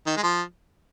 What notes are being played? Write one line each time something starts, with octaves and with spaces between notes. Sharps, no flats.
D#3
G#3
F3